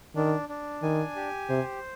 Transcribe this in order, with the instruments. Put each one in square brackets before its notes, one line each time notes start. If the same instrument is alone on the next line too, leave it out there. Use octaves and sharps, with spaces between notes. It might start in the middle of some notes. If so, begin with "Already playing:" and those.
[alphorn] D#3 [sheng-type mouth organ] D4
[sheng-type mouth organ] D4
[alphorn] D#3 [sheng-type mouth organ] G#5
[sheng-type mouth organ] G4
[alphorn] C3 [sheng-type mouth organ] C5